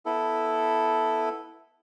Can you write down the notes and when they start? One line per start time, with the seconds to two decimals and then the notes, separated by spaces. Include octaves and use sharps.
0.06 B3 E4 A4